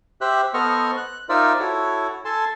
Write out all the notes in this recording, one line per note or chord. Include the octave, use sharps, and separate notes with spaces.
G4 C5 E5 F#6
B3 A4 C5 D#5 C#6 F6
F#6
D#4 F4 A#4 C5 D5 E5
E4 F#4 A4 C#5
A4 G#5 A5 C6